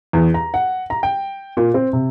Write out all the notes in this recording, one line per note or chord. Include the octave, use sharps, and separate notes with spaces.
E2
A#5
F#5
A#5
G5
A#2
C4
C3